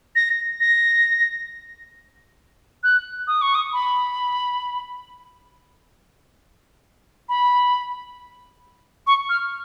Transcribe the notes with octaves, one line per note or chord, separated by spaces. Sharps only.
A#6
A#6
F#6
D#6
C#6
D#6
B5
B5
C#6
F6